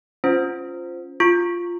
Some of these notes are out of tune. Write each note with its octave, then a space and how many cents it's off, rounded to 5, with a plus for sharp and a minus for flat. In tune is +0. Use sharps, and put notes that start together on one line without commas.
C#4 +0 F4 +0 C5 -10
F4 +0 C#6 -5